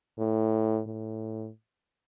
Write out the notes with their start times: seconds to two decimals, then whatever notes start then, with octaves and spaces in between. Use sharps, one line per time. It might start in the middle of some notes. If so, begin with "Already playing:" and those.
0.19 A2
0.87 A2